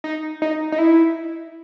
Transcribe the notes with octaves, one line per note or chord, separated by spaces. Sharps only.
D#4
D#4
D#4
E4